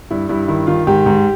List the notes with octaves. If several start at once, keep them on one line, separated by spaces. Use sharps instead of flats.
G2 E4
G2 E4
D#3 E4
D#3 F4
G#2 G4
G#2